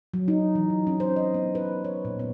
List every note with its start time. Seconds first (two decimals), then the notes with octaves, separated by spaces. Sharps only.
0.14 F#3
0.28 D#4
0.55 E3
0.70 F#3
0.87 C#4
1.00 C5
1.16 D#5
1.34 B3
1.55 B4
1.85 C#5
2.05 A#2
2.19 B3